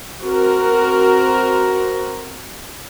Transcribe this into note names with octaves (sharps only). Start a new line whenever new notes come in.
C4 F#4 A#4